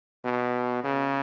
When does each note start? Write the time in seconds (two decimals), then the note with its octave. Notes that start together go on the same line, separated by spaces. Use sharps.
0.25 B2
0.84 C#3